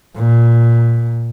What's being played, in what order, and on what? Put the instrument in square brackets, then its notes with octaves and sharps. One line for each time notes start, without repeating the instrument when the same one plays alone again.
[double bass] A#2